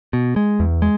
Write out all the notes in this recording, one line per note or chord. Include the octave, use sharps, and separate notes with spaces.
B2
G#3
E2
G#3